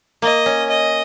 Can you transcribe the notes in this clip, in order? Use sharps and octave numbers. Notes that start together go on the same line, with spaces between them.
A#3 D#5
C#4
D#5